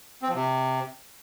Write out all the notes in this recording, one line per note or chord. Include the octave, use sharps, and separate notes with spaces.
C4
F3
C3